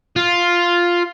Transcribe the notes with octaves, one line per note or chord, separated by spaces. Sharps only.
F4